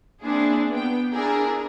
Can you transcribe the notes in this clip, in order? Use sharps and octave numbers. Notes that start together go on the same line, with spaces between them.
A#3 C4 D4 E4 G#4
B3 G5
D4 E4 G#4 A#4